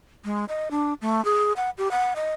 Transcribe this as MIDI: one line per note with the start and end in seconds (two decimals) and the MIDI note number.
0.25 0.45 56
0.49 0.69 75
0.71 0.94 62
1.01 1.24 57
1.25 1.53 68
1.56 1.70 78
1.78 1.91 67
1.91 2.14 78
2.16 2.33 75